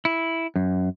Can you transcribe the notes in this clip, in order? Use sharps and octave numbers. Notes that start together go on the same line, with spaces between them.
E4
F#2